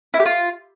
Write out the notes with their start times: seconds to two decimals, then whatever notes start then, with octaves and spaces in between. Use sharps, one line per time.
0.14 E4
0.20 G4
0.25 F4